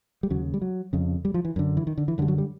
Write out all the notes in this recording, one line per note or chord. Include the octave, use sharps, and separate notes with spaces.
G3
D#2 C#3 F#3
G3
F#3
F2 C#3
G3
F3
E3
F#2 D3
E3
D#3
D3
E3
F#2 D3 G3
F#3
G3